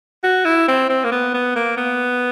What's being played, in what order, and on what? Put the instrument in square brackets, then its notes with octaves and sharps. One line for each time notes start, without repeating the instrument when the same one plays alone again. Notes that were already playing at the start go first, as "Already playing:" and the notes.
[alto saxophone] F#4
E4
C4
C4
A#3
B3
B3
A#3
B3